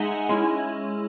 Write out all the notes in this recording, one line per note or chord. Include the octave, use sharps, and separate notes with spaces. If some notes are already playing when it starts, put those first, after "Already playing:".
Already playing: G#3 D#4 D#5 E5 F#5 G#5
G#3 C#4 E4